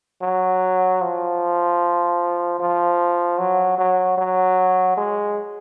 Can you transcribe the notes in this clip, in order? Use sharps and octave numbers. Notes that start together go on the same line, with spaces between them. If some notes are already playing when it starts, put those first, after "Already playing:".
F#3
F3
F3
F#3
F#3
F#3
G#3